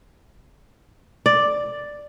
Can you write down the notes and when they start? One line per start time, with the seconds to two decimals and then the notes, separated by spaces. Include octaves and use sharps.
1.26 D5